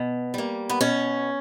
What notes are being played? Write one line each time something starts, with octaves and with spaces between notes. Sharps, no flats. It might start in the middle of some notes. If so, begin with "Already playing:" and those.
Already playing: B2
G3 A#3
B3
B2 C#4